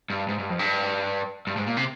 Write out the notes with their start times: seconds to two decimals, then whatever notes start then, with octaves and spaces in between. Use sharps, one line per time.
0.10 G2
0.29 G#2
0.39 G2
0.49 F2
0.59 G2
1.47 G2
1.57 G#2
1.67 A#2
1.77 C3